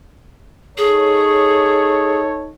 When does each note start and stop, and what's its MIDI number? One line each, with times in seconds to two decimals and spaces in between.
0.77 2.52 63
0.77 2.18 68
0.77 2.52 69
0.77 2.52 73